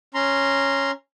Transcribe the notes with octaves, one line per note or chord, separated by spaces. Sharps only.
C#4 A#5 C6